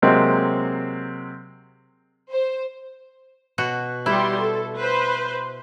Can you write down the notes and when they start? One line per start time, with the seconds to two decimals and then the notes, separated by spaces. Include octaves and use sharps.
0.02 C3 F#3 G#3 A#3 C4
2.31 C5
3.58 B2 F#4
4.06 G3 E4 G4 C6
4.39 A4
4.78 B4 C5